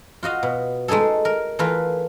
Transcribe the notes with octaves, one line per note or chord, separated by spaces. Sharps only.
F4 F#4 D#5 F5
B2
G#3 A3 D#4 G#4 A4
A#4
E3 A3 F4 A#4 B4